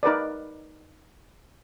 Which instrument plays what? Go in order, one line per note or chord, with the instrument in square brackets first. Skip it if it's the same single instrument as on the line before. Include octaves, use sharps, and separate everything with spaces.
[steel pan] D#4 A#4 B4 D5